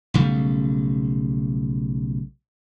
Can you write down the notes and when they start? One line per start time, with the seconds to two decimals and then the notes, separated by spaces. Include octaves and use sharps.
0.14 B1 C#3 G3 A3